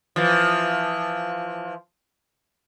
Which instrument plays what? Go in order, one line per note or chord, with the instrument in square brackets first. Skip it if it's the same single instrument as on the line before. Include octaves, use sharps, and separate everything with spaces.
[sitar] E3 F3